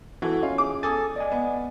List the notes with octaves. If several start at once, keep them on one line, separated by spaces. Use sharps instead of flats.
E3 F#4 A4
C#4 F4
G#4 D6
A4 G#5 D#6 A6
D5 D#5 G#5
B3